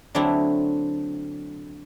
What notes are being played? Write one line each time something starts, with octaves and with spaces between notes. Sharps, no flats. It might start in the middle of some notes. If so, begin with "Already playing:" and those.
D3 F#3 A3 C4 D4 E4